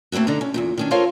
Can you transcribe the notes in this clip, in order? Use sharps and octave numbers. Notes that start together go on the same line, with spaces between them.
A3 A#3 C4 E4 F#4
D3 D4 D#4 A#5
C#4
E2 G2 A#2
D#3 C#4 D4
F4 A4 A#4 C5 C#5 F5